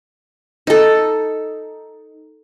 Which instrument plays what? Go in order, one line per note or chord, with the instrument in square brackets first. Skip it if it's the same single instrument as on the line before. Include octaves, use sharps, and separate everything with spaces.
[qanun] D#4 A4